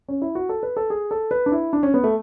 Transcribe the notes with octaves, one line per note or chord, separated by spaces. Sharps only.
C#4
E4
F#4
A4
B4
A4
G#4
A4
B4
D4
E4
D4
C#4
B3
A3